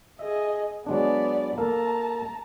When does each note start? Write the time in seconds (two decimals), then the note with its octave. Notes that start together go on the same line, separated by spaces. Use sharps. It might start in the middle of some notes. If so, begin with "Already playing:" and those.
0.19 G#4 D#5 E5
0.87 F#3 G#3 B3 D4 D5
1.58 A#3 A4 A#4 A5 A#5